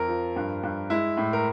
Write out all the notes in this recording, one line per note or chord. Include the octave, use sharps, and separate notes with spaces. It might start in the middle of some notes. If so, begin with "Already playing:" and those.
Already playing: F2 A#4
F3
G2
G2
G#3 E4
A2
A#4